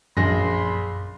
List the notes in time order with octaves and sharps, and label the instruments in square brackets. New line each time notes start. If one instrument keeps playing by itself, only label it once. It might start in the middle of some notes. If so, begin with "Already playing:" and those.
[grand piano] A#1 G#4 A#6 [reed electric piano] F#2 [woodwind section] B5 C6